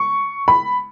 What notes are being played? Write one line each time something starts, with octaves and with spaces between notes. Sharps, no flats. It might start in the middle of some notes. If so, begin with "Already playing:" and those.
Already playing: C#6
B5